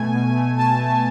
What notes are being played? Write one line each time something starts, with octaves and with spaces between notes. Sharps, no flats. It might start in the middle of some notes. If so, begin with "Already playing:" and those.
Already playing: B2 A3 G#5
B2
A3
B2 A5
A3